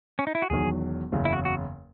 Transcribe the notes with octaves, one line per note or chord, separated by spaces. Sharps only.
C#4
D#4
E4
F#4
E1 E2 D#3 F#3 G#4
F#1 E2 C#3
E4
F#4
F#4